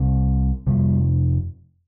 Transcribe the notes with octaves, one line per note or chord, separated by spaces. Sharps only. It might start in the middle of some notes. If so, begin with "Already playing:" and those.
Already playing: C2 C3
F2 C3 G3